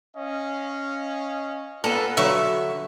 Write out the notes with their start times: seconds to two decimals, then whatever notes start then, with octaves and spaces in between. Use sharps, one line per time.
0.16 C#4 D#5 F5
1.84 A#3 B3 F4 A4 B4 G#5
2.17 D3 F#3 E5 C#6